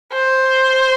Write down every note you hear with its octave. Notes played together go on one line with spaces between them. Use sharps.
C5